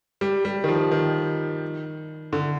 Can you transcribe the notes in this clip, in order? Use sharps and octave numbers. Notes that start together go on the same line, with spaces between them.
G3
G3
D#3
F3
D#3
D3